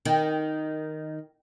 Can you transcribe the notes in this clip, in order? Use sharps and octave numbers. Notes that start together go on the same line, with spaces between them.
D#3